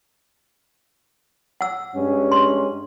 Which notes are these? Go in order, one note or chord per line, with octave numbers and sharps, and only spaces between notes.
F#5 E6
G2 G#3 C#4
C6